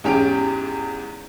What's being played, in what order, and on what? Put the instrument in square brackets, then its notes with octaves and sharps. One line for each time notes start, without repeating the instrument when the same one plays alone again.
[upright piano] E2 G#2 C#4 G4 D7